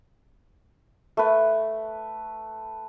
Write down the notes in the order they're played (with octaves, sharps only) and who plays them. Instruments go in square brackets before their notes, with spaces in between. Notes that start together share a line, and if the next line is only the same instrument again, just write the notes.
[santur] A3 B4